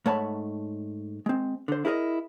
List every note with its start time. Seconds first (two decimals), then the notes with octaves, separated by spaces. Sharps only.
0.06 G#2 A3 C#5 F#5 A5 B5
1.26 G#3 C4
1.68 D3 C5
1.85 E4 G#4 A#4 B4 D#5